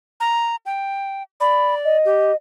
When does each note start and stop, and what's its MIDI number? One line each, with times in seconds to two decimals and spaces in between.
0.20 0.56 82
0.66 1.23 79
1.40 1.97 74
1.40 1.75 83
1.84 2.35 75
2.05 2.32 67